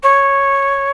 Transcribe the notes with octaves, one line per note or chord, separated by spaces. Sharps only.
C#5